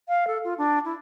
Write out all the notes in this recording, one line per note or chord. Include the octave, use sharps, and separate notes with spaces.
F5
A4
F4
D4
E4